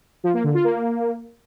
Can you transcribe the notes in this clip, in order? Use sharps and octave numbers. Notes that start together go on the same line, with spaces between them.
F3
A#3
D3
F4
A#3